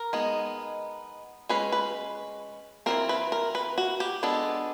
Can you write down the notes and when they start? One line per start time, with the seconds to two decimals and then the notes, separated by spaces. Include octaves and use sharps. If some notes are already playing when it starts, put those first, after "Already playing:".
Already playing: A#4
0.13 G#3 B3 D#4
1.49 G#3 C#4 B4
1.72 B4
2.86 E3 A3 C4 A#4
3.09 B4
3.32 A#4
3.55 B4
3.78 F#4
4.00 G4
4.23 G#3 B3 D4 A4